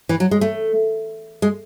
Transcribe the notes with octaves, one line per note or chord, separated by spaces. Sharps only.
E3
F#3
G#3
A3
G#3